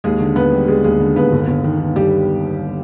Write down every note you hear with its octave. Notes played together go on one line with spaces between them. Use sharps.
D#2 G#3 G#4
D3
D#2 B3 B4
G3
G3 G#3 G#4
D#2 G#3 G#4
D3
D#2 B3 B4
G1
G1
D#3
D#3
G1 G3 G4